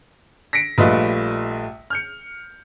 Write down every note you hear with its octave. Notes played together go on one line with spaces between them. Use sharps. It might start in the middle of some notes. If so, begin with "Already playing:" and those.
A#6 B6 C#7 D7
A#1 G3 A3 F4 B4 D#5
F6 G6 C#7